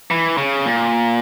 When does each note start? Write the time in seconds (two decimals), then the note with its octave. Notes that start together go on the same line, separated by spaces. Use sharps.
0.11 E3
0.38 C#3
0.65 A#2